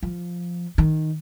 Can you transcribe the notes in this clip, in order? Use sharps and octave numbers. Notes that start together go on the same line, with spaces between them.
F3
D#3